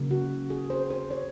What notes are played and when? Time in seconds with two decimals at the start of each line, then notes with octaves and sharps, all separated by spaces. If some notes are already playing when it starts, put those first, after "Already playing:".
Already playing: C#3 F#3 A#3
0.11 F#4
0.50 G#4
0.70 C5
0.90 C5
1.11 C#5